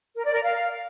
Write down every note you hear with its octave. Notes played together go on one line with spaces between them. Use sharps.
A#4
D5
A#4
F5